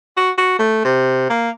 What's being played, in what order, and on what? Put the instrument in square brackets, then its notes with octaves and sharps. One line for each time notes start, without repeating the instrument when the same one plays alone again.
[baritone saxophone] F#4
F#4
A3
C3
A#3